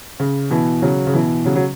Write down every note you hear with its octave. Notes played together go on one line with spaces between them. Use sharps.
C#3
B2 E3
C#3 F#3
C#3
B2 E3
C#3 F#3
F#3